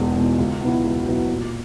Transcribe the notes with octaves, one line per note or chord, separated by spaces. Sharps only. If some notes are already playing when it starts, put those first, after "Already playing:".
Already playing: E1 E2 B2 G#3
E2 B2 G#3
C#2
B2 F#3 B3 E4
C#2
B2 F#3 B3 E4
A#2